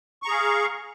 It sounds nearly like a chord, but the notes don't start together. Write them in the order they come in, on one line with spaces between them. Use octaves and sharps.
C#6 A#5 G#4 F5